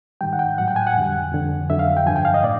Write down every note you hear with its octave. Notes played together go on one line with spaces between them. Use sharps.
G#2 D#3 G3 G5
F#5
G5
A2 F#3 F#5
G5
G#5
F#5
F2 D3 G3
F2 D3 F3
F2 D3 F#3 E5
F5
G5
G2 D3 F3 G#5
G5
F5
D#5
A2 D5